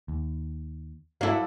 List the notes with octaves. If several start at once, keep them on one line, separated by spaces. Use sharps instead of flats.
D#2
F#3 E4 A4 D5 F5